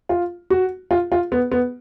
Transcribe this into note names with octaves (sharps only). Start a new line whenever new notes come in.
F4
F#4
F4
F4
B3
B3